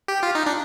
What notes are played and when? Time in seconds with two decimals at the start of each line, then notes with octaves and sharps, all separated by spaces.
0.08 G4
0.23 F4
0.35 D#4
0.46 D4